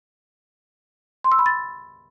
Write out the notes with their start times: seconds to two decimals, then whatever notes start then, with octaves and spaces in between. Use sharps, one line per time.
1.24 C6
1.32 E6
1.39 B5
1.46 A6